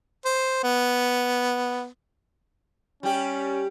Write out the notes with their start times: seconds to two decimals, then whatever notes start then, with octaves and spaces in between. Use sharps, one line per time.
0.25 C5
0.64 B3
3.03 G3 C#4 G4